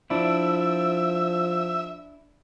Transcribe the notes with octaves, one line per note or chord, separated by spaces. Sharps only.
F3 D4 E4 E5